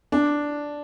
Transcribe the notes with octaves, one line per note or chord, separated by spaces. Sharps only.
D4